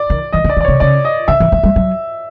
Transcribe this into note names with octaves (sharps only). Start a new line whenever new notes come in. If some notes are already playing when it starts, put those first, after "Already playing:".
Already playing: D5
D#3
E3 D#5
D3
D5
D#3
D5
C#3 C#5
C#3 D5
D#5
D3 E5
E3
F3
G3
F#3